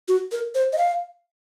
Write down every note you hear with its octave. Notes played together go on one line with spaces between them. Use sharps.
F#4
A#4
C5
D#5
F5